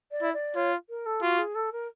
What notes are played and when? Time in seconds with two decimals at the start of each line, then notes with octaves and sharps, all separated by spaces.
0.11 D5
0.22 E4
0.34 D5
0.56 F4 C#5
0.89 A#4
1.06 A4
1.22 F4 F#4
1.38 G#4
1.55 A4
1.72 A#4